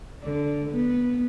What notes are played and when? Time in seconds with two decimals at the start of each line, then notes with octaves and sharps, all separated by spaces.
0.22 D3
0.70 B3